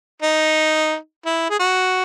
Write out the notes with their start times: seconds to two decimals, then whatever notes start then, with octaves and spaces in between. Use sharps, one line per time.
0.22 D#4
1.26 E4
1.50 G#4
1.59 F#4